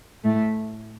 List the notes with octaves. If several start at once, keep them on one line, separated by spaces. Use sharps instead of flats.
A2 A3